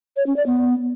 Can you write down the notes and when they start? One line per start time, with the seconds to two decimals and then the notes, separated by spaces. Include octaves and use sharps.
0.16 C#5
0.26 C#4
0.36 D5
0.46 B3